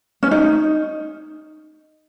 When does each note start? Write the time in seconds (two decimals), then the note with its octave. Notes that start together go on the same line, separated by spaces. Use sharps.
0.23 C#4
0.31 D#4